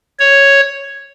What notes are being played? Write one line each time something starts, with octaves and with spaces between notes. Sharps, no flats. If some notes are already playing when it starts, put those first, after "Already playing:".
C#5